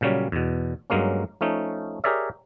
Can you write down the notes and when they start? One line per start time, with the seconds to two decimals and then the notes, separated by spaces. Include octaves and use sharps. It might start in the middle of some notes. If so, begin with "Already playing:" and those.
0.01 A#2 C#3 F#3 G3 C#4
0.32 E2 B2
0.90 G2 F#3 G#3 A#3 C#4
1.41 F3 A3 C#4 D#4
2.04 G4 G#4 A#4 C#5 D5 E5